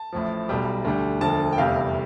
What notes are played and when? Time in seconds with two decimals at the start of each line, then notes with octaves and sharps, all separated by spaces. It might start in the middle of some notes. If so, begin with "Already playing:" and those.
Already playing: A5
0.12 A1 A2 F3
0.49 B1 B2 G3
0.85 D2 D3 G3
1.21 E1 D2 D3 F3 A5
1.53 G5
1.58 F1 E2 C3 G3 F5